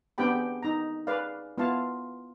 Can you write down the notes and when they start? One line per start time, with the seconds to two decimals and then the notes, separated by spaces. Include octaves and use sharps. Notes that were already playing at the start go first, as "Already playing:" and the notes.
0.18 B3 C4 D4 G4 G5 B5
0.35 G#4
0.63 D#4 A#5
1.07 G#4 B4 D5 F5
1.58 B3 E4 F4 F5 A5